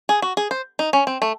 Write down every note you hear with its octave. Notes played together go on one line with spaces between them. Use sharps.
G#4
F#4
G#4
C5
D#4
C#4
C4
A3